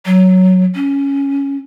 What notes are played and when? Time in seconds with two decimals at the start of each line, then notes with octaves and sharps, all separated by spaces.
0.06 F#3
0.75 C#4